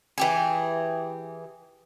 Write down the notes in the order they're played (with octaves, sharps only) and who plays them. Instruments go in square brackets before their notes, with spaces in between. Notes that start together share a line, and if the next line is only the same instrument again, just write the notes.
[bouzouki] E3 G4 G#4